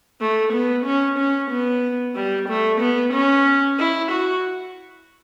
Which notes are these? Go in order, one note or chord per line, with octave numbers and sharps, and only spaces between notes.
A3
B3
C#4
C#4
B3
G3
A3
B3
C#4
E4
F#4